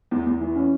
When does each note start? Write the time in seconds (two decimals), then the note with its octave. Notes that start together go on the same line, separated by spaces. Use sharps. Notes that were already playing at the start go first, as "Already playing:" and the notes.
0.11 E2
0.26 E2
0.41 E3
0.56 C#4